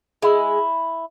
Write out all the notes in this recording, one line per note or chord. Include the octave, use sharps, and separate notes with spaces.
G#3 E4